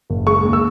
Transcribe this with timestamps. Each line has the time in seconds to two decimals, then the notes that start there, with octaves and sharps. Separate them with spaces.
0.10 F#1
0.27 G#3 C#6
0.45 D#2
0.53 E6